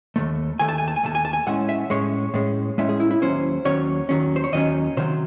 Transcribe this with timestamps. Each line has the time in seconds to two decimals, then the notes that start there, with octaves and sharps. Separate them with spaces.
0.16 D#2 D#3 A3
0.59 D#2 D#3 A3 G#5
0.69 A5
0.78 G#5
0.88 A5
0.96 G#5
1.03 D#2 D#3 A3 A5
1.15 G#5
1.25 A5
1.33 G#5
1.47 A2 G#3 C#4 F#5
1.69 E5
1.90 A2 G#3 C#4 C#5
2.34 A2 G#3 C#4
2.78 A2 G#3 C#4 E5
2.89 G#4
3.00 E4
3.11 E4
3.22 D#2 D#3 F#3 C#4 C5
3.65 D#2 D#3 F#3 C#4 C#5
4.09 D#2 D#3 F#3 C#4
4.36 C5
4.44 C#5
4.52 D#2 D#3 F#3 C#4 D#5
4.97 C3 D#3 F#3 C5